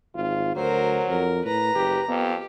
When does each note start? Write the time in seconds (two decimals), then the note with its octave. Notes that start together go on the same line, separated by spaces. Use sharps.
0.15 G#1 F4
0.56 D2 F#3 A#4 C5
1.08 F2 A#4
1.45 A2 B4 A#5
1.75 F#1 G4
2.08 F2 B3 G4